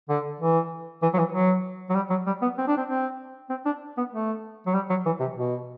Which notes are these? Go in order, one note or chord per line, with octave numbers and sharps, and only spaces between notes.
D3
E3
E3
F#3
E3
F#3
F#3
G3
F#3
G3
B3
C4
D4
C4
C4
C4
D4
B3
A3
F#3
G3
F#3
E3
C3
B2